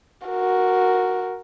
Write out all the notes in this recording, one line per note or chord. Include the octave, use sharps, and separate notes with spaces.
F#4 A#4